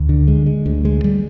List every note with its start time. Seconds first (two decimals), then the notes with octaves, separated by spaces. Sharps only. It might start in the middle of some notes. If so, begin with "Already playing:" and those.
Already playing: D2
0.09 D3
0.28 G#3
0.46 G#3
0.66 D2
0.85 G#3
1.04 G3